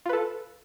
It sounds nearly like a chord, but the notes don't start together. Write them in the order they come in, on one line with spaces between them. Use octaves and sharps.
F4 B4 A4